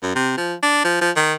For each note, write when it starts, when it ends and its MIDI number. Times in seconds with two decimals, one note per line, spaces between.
0.02 0.15 42
0.16 0.32 48
0.37 0.54 53
0.62 0.82 62
0.85 0.97 53
1.01 1.11 53
1.16 1.34 51